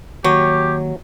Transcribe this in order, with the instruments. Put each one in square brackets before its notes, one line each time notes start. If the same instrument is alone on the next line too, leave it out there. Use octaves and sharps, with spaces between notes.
[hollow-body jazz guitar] D#2 [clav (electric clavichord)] F#3 [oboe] G4 [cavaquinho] C#5